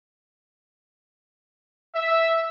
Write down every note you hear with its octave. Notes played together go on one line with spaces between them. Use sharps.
E5